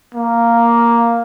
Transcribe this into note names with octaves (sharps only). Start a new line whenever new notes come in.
A#3